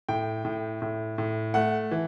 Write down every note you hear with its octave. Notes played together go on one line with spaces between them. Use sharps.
A2 G5
A2
A2
A2
A3 F#5
E3